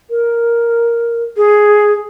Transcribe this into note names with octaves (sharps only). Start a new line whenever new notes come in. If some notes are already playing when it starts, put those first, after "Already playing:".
A#4
G#4